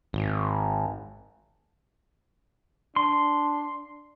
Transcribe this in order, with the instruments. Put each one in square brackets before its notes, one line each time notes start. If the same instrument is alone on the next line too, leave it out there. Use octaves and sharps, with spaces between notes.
[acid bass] G#1
[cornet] D4 [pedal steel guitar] C6